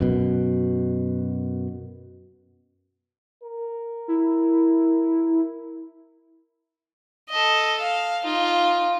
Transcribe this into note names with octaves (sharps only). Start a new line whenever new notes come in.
F#2 B2
A#4
E4
A4 D#5
F5
D#4 F4